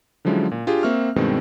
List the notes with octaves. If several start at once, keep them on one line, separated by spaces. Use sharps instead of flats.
D3 F3 F#3 G#3 C#4 E4
A#2
D4 F4 G4 G#4
A#3 C4 E5 C#6 F6
G2 B2 D#3 G#3 C4